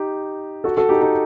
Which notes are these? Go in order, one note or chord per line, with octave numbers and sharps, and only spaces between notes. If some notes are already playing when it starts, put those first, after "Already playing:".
Already playing: D#4 G4
F#4 A4
F#4 A4
D#4 G4
D#4 G4